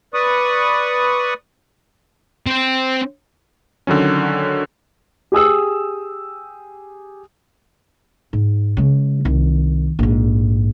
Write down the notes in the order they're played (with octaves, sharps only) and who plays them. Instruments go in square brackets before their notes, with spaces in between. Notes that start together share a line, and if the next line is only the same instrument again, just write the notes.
[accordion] B4 D5 C#6 D#6
[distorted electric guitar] C4 C5
[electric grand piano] D3 D#3 F#3 C#4
[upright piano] G4 G#4 D#6 E6
[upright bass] G#2
C#3 G#3
C2 D#3
A#1 G#2